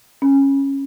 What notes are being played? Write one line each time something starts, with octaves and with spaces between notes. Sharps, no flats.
C#4